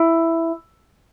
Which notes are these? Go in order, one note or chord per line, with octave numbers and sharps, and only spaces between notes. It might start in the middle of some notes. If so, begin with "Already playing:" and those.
Already playing: E4